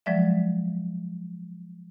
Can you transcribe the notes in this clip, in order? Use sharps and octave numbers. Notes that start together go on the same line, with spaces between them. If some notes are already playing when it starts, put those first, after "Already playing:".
F3 F#3 G#3 D5 E5